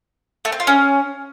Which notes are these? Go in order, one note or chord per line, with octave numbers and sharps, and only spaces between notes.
A3
C4
F4
C#4